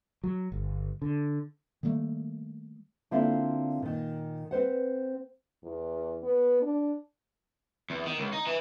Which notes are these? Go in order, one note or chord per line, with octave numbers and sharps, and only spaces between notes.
F#3
G1
D3
D#3 G3 A3 A#3
D3 A#3 C4 E4 F4 F5
A#2 D#3
C4 B4 C5 F#5
E2
B3
D4
E2
D#3
C#2
D#4
E3